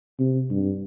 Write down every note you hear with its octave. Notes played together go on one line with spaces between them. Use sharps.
C3
G2